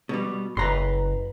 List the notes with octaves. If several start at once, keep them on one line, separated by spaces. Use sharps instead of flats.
B2 G3
F#1 B4 A#5 C6